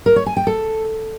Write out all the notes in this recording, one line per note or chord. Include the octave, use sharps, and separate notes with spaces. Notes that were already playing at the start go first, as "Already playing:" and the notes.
A#4
C#5
G#5
G5
A4